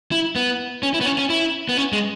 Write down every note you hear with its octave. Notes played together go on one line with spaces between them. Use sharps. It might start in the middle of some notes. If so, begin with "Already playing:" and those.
E4
B3
C#4
E4
B3
C#4
C#4
E4
B3
C#4
G#3